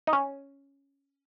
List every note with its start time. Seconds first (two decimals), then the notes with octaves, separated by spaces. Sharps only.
0.07 D#4
0.13 C#4